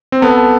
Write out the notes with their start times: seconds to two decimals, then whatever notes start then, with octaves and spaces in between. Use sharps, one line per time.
0.12 C4
0.22 B3 A4